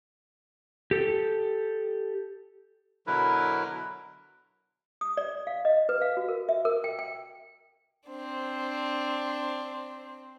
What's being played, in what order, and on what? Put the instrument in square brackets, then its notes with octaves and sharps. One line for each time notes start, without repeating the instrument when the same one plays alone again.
[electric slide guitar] G4 A4
[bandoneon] B2 D3 F#3 E4 A#4 B4
[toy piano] D#6
D5
F5
D#5
B4
F5
F#4
A#4
E5
A#4
G5
G5
[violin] C4 D4